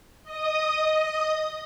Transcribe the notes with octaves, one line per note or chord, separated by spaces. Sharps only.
D#5 D#6